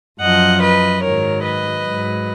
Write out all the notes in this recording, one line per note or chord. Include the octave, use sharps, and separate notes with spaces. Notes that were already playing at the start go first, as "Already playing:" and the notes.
F#2 F3 D#5 F#5
B4 D#5
G#2 D#3 F#3 A#4 C#5
B4 D#5
G#2 F#3